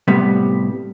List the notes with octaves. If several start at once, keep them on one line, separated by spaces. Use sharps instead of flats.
A2 C3 G3 B3